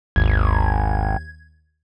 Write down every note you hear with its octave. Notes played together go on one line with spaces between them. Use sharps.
G#1 D#2 G#6